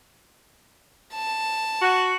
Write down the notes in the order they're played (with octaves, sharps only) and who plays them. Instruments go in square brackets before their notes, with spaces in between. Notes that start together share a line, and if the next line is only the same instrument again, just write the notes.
[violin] A5
[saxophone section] F#4